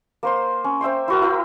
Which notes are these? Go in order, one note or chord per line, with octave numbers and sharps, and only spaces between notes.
A#3 C5 C6
C#4
C5 E5 G5 C6
E4 F#4 A#4
E4 A#4 G5